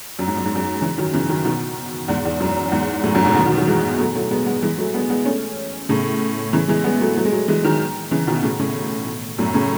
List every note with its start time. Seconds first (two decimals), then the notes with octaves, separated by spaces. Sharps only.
0.19 F#2
0.28 G#2
0.37 F#2
0.46 G#2
0.55 F#2
0.82 C#3 E3
0.98 D#3 F#3
1.13 C#3 E3
1.29 D#3 F#3
1.45 B2 D#3
2.08 E2 G#2
2.25 E2
2.40 F#2
2.72 E2 G#2
3.04 F#2 A2
3.14 F#2 A2
3.25 G#2 B2
3.35 B2 D#3
3.46 B2 D#3
3.57 D#3 F#3
3.67 E3 G#3
3.99 F#3 A3
4.15 F#3 A3
4.31 G#3 B3
4.46 G#3 B3
4.63 E3 G#3
4.78 F#3 A3
4.94 G#3 B3
5.10 G#3 B3
5.25 A3 C#4
5.89 A2 C#3
6.53 C#3 E3
6.68 E3 G#3
6.84 G#3 B3
7.00 F#3 A3
7.16 F#3 A3
7.25 G#3
7.32 F#3 A3
7.48 E3 G#3
7.63 D#3 F#3
8.11 C#3 E3
8.27 B2 D#3
8.43 A2 C#3
8.59 A2 C#3
9.38 F#2 A2
9.54 A2 C#3